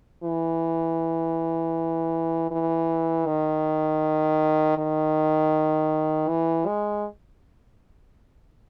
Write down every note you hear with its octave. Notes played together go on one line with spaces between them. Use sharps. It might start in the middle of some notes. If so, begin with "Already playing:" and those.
E3
E3
D#3
D#3
E3
G#3